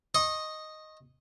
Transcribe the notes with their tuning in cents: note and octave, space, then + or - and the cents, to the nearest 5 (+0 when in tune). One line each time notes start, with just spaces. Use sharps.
D#5 +0 C#6 -35